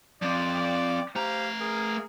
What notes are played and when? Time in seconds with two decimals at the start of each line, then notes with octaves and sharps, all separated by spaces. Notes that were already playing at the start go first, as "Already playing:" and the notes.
0.22 F3 C4 D5
1.16 A3 G4 C5 F5 A#5
1.60 G#4 A#4